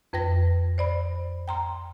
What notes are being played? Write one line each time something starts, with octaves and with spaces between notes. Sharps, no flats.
F2 B4 G5 A#6
C5 D5 B5
G5 A#5 C6